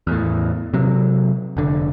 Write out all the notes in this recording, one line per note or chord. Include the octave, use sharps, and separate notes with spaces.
E2 A2
C3 F#3
F1 D3